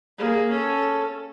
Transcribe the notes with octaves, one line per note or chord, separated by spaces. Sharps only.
A#3 G#4
C#4 A4